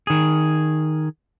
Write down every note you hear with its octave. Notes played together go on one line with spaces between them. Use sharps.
D#3 G#4